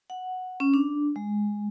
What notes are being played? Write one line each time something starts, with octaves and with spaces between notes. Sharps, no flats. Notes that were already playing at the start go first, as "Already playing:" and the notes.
F#5
C#4
D4
G#3